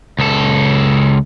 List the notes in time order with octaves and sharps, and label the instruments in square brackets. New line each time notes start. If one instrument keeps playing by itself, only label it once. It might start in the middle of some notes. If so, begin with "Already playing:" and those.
[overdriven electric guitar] C#2 A4